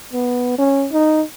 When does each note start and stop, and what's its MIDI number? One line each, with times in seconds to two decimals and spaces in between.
0.13 0.55 59
0.58 0.87 61
0.92 1.22 63